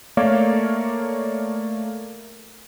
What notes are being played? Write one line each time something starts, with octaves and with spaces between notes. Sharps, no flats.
A3 A#3 A#4 C#5 D5 F5